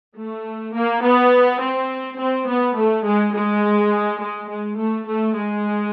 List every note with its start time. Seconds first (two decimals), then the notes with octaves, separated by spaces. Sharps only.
0.16 A3
0.75 A#3
1.03 B3
1.61 C4
2.19 C4
2.47 B3
2.75 A3
3.05 G#3
3.34 G#3
4.21 G#3
4.49 G#3
4.78 A3
5.07 A3
5.35 G#3